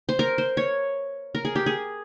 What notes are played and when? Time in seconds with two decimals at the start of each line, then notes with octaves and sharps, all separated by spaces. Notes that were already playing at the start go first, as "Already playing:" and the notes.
0.09 C5
0.19 A#4
0.38 C5
0.57 C#5
1.35 A#4
1.45 G#4
1.56 G4
1.66 G#4